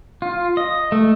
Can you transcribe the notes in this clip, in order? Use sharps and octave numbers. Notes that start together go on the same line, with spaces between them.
F4
D#5
A3